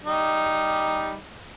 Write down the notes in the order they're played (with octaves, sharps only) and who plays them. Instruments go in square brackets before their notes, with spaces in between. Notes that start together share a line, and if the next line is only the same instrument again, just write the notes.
[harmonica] G3 D#4